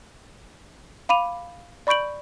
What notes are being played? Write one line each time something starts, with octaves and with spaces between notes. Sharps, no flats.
F5 B5 D6 D#7 F7
D5 B5 C#6 G6 D7 F#7